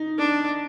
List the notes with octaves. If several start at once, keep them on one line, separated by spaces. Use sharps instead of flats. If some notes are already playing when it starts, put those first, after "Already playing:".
Already playing: D#4
D4